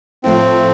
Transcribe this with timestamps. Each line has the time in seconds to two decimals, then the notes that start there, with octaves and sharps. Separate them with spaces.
0.24 A2 F3 A3 C4